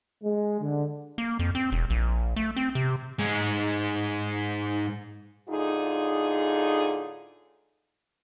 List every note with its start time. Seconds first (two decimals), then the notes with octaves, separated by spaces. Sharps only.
0.24 G#3
0.61 D3
1.18 A#3
1.39 F2
1.55 C4
1.72 E1
1.90 A#1
2.36 A3
2.57 C4
2.75 C3
3.19 G#2 G#3
5.48 A2 D3 D#4 F4 G#4